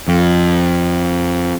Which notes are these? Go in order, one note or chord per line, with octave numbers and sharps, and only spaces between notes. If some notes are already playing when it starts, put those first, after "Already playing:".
F2